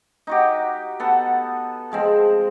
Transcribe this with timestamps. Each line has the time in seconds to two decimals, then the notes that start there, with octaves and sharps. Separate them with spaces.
0.27 D#4 F#4 G4
1.00 B3 A4 F#5
1.92 F3 G#3 C4